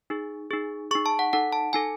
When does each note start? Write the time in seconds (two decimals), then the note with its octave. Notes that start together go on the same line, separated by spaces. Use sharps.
0.10 D#4 G#4
0.51 D#4 G#4
0.91 D#4 G#4 C#6
1.06 A5
1.19 F#5
1.33 D#4 A4 F#5
1.52 A5
1.73 D#4 A4 G#5